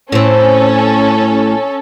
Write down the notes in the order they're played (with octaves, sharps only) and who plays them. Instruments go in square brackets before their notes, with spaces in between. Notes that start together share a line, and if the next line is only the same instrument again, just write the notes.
[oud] A2 C4 [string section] C#4 A4